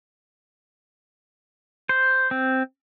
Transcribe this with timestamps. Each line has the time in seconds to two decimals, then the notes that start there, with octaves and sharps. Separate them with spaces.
1.89 C5
2.31 C4